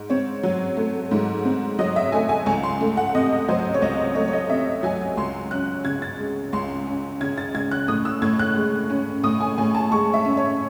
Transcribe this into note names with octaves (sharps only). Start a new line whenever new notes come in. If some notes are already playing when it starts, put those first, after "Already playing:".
Already playing: G#2
C4 C#5
F#3
A3
G#2
C4
F#3 D#5
E5
A3 G#5
G#5
C#2 G#5
C6
A3
F#5
C3 D#5
F#3 C5
C#5
C#2 D#5
A3 C#5
C#5
D#5
C3 E5
F#3 G#5
C#2 C6
C#4 F#6
C#3 G#6
A6
G#3
C#2 C6
C#4
C#3 G#6
A6
G#3 G#6
F#6
A2 D#6
E6
A2 G#6
F#6
G#3
C#4
A2 D#6
G#5
A2 G#5
A5
G#3 C#6
E5
C#4
C#5